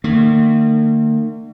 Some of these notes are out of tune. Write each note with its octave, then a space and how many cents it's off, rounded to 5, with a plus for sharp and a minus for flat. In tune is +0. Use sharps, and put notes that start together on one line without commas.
D#3 -40 A#3 -45